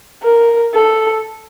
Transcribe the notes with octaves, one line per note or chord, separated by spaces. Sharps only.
A#4
A4